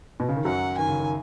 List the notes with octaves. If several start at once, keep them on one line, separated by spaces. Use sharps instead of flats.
B2
C#3
D#3
F#2 F#3 F#5
D#3 G#5
C#3
D#3